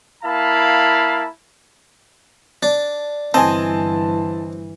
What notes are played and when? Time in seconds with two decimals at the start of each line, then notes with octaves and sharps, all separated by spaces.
0.23 A#3 E4 F5 A5 B5
2.63 D4
3.34 G1 E3 C4 D#5 G#5 A5